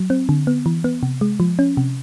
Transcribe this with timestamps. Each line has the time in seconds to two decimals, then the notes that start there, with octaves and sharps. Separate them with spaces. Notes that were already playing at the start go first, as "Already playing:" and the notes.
Already playing: F#3
0.10 C4
0.29 D3
0.47 B3
0.66 E3
0.84 B3
1.03 C3
1.21 G#3
1.40 F3
1.59 C#4
1.77 C3